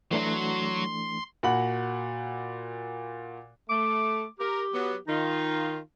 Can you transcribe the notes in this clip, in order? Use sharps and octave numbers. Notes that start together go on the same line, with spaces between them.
E3 F#3 A3 D4 C6
A#2 F#4 F#5 B5 F#7
A3 D6
G4 A#4
F#3 B3
D#3 D#4 F4